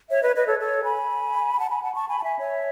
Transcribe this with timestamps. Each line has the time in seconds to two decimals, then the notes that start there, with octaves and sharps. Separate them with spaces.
0.10 C#5 E5
0.22 B4 D#5
0.29 C#5
0.35 B4 D#5
0.47 A4 C#5
0.59 A4 C#5
0.84 G#5 B5
1.58 F#5 A5
1.70 G#5 B5
1.83 F#5 A5
1.94 A5 C#6
2.07 G#5 B5
2.18 A5
2.23 E5 G#5
2.39 C#5 E5